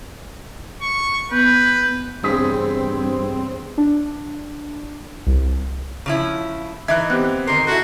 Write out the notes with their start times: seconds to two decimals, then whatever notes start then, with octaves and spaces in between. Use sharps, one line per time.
0.81 C#6
1.32 B3 B4 G6
2.24 E2 G2 C#3 C4 G#4 D#6 B6
3.78 D4
5.27 C2
6.06 C#3 F3 E4
6.88 E3 D#4 E5 F#6 G#6
7.10 B3 C4 G4 F#6
7.47 D#3 E3 A#4 C6
7.67 E4 F#4 A4